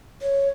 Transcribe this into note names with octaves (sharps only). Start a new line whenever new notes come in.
C#5